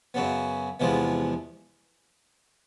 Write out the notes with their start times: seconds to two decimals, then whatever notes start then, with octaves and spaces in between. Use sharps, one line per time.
0.14 F#2 C#3 F#3 B3
0.80 E2 C3 F3 G#3 B3